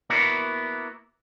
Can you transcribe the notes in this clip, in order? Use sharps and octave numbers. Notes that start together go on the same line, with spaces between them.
A#3 B3 E4 F#4